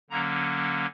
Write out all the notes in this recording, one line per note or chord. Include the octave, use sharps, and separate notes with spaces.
D3 F#3 A#3 C#4 A#5